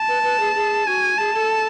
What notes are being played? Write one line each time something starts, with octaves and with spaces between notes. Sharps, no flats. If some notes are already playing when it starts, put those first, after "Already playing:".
Already playing: A5
B4
B4
G#4
G#4
F#4 G#5
G#4 A5
A4